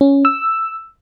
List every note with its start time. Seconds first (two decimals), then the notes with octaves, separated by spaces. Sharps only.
0.01 C#4
0.25 E6